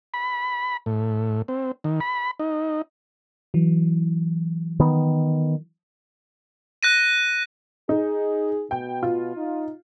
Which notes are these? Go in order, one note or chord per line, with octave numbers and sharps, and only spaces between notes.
B5
A2
C4
D#3
B5
D#4
E3 F#3
D#3 B3
F#6 A#6 D#7
D#4 G#4
B2 G5
F4
D#4